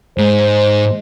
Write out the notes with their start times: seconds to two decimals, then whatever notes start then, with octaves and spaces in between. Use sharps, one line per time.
0.18 G#2 G#3 C5